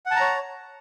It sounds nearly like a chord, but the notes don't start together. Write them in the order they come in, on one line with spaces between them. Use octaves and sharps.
F#5 A5 A#5 C#5